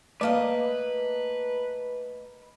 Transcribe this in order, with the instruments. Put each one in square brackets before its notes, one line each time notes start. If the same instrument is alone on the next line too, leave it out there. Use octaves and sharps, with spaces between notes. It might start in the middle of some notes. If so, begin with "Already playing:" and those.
[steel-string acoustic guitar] A3 A#3 D#5 [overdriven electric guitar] B4 [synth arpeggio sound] D5 F5